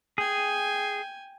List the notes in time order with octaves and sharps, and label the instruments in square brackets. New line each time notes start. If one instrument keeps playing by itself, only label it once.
[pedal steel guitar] G#4 [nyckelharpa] G5 G#5